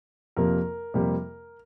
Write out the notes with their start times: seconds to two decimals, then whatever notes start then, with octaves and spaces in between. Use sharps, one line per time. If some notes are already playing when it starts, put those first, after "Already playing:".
0.36 F2 C3 A#3 A#4
0.94 F2 C3 G3 A#3